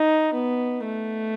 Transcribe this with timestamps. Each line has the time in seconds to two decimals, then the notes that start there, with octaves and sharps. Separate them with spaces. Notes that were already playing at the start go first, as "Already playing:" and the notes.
Already playing: D#4
0.34 B3
0.85 A3